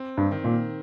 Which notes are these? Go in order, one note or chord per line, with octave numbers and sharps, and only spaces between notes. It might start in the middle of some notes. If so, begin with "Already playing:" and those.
Already playing: C4
G2
D#3
A#2